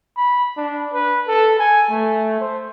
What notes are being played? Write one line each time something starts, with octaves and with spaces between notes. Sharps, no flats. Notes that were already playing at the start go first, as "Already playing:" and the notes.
B5
D4
B4
A4
G#5
A3
C5